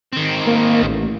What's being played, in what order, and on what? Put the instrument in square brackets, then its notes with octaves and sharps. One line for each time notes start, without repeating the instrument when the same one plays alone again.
[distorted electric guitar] D#3 C4
[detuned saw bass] A#3
A1